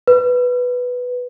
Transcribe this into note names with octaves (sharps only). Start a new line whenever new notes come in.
B4